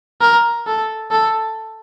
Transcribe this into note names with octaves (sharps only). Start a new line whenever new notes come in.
A#4
A4
A4